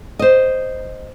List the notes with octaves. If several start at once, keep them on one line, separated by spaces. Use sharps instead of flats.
C5 D#5